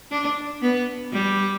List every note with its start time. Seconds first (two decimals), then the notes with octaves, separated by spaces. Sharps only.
0.11 D4
0.62 B3
1.12 G3